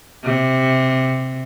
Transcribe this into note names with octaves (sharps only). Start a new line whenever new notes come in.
C3